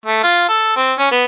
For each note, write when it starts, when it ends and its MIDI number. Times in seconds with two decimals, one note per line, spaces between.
0.06 0.21 57
0.23 0.47 65
0.49 0.75 69
0.77 0.94 60
0.99 1.07 61
1.12 1.25 59